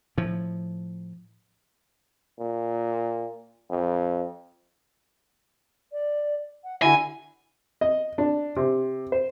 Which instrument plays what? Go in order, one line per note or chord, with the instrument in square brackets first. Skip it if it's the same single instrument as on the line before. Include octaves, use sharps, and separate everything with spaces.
[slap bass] A2 F3
[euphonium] A#2
F2
[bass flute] D5
F#5
[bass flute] D3 [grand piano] E4 F#4 [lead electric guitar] G#5
[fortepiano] D#5
D4
C3
C5